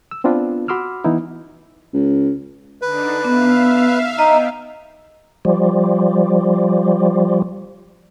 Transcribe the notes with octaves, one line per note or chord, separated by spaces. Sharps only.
E6
B3 C4 D4 F4 B4
F#4 B5 C6 D6 E6 F6
E3 B3 D#4 E4
C#2
D3 D4 D#4 B4
B3 E5 F5
B3 D#4 D#5 G5
F3 G3